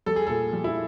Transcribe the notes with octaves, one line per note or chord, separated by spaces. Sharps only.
G3 A4
G#4
A#2 A4
G3
E4